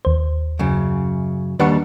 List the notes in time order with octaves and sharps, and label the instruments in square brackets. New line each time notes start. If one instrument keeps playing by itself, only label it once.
[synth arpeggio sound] D#2 C5
[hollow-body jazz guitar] F#2 C#3
[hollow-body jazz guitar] D#2 G3 D4 [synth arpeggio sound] B4 F#5 C#6